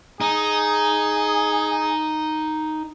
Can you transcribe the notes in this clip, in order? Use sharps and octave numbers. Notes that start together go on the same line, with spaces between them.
D#4 G#4